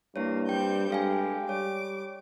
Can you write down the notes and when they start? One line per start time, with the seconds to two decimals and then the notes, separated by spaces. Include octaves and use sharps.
0.16 G2 A#3 E4 C#5
0.49 G3 C4 G4 G5 G6
0.90 G2 G#3 A4 F5 G#5
1.49 G3 C#5 D6